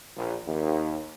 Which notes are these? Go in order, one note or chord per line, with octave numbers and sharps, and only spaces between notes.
A#1
D#2